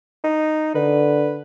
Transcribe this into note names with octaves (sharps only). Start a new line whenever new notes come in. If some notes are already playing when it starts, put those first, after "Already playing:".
D#4
D3 B4